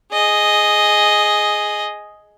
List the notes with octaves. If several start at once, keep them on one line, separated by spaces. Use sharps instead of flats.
G#4 D#5